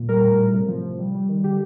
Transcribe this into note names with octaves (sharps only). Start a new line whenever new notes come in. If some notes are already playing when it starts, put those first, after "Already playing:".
Already playing: A#2
G3 A#4
A2
A2
C3
F3
C3
G3
G3
D#3
D3 G4